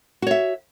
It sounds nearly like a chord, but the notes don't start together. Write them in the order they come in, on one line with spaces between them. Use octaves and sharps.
F#4 C#5 E5